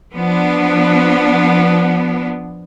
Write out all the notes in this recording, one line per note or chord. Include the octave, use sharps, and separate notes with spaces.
F3 B3 D4